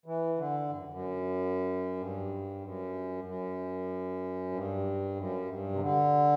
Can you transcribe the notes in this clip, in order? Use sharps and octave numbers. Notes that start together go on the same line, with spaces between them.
E3
D3
G2
F#2
F#2
G2
F#2
F#2
G2
F#2
G2
C3
D3